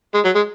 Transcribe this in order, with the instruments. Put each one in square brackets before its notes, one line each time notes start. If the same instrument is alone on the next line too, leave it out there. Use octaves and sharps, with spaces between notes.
[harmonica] G#3
F#3
G#3